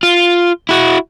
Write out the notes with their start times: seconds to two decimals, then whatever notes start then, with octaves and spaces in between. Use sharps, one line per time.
0.03 F4
0.69 E4 F#4